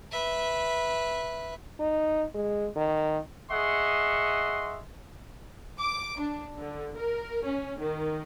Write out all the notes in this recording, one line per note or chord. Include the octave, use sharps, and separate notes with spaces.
B4 E5
D#4
G#3
D#3
G#4 D#5 E5 F#5 C6 C#6
D6
D4
D3
A#4
C#4
D#3